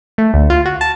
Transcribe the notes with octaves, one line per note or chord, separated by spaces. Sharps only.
A3
D2
F4
F#4
A5